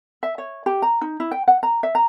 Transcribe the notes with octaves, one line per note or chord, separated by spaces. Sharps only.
E5
C#5
G4
A#5
D#4
E4
G5
F#5
A#5
E5
A#5